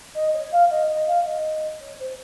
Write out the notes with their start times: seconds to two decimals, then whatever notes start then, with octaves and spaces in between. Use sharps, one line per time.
0.15 D#5
0.34 C#5
0.51 F5
0.70 D#5
0.89 D#5
1.07 F5
1.25 D#5
1.81 C#5
1.99 C5